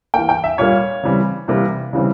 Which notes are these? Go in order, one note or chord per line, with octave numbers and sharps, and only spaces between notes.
E3 A#3 G5
G5
E5
A#2 G3 A#3 C#5
C#3 E3 G3 C4
C3 E3 G3 A#3
C#3 E3 G3 C4